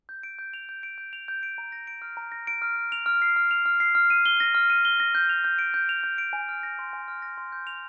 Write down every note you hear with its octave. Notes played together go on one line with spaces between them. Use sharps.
G6
D7
G6
F7
G6
D7
G6
F7
G6
D7
A#5
A#6
D7
F6
A#5
A#6
D7
F6
F6
F7
F6
C7
F6
F7
F6
C7
F6
D#7
G7
A#6
F6
D#7
G7
A#6
G6
F7
G6
D7
G6
F7
G6
D7
G#5
F6
A#6
C6
G#5
F6
A#6
C6
G6
F7